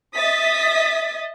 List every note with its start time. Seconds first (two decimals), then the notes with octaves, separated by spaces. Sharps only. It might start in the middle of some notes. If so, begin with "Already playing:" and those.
0.15 D#5 E5 D#6 A6 B6